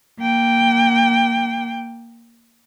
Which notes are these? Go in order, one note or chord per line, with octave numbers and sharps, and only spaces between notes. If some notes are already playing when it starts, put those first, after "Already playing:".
A#3 G5